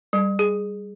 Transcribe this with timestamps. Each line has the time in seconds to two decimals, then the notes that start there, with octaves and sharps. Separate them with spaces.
0.13 G3
0.39 G#4